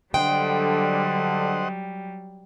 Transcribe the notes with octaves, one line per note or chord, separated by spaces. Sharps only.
D3 F#3 G3 C5 D#5 F#5 G5